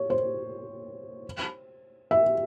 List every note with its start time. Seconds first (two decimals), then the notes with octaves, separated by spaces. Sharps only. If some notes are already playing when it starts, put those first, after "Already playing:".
Already playing: C#5
0.10 C5
2.11 E5